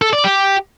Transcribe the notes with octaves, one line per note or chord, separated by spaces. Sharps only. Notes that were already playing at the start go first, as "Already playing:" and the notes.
A4
D5
G4